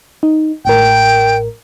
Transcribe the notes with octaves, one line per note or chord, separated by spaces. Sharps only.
D#4
A1 A2 A#4 G5